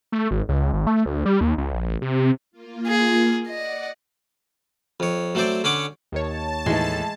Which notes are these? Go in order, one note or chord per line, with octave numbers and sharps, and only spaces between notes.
A3
G#1
C#2
G#1
A3
D2
G3
D#2
C#2
A#1
A1
C3
A#3 F4
G#4
D5 D#5 F#5
F2 C#5
F#3 A3 C4 C5 D5
D3 C#4 C#5 F#5 D6
D#2 D#3 C#5 A5
A2 E3 G#3 D#4